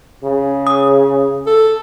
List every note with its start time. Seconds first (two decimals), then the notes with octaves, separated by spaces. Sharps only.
0.24 C#3
0.67 D#6
1.46 A4